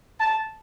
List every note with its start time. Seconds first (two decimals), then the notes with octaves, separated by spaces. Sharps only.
0.20 A5